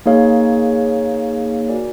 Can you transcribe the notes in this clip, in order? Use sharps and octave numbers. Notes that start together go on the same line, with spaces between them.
A#3 D#4 G#4 C#5 F5
F#4 A#4 D5 F5 G#5